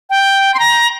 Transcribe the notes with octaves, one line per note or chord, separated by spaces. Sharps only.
G5
C6
A#5